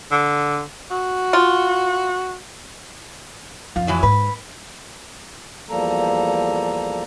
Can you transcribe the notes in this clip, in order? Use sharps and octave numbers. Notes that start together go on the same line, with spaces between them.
D3
F#4
F4
F2 F4
A2 E3 F#3
G#2 B4
E2 F3 G3 A#3 A4 A#5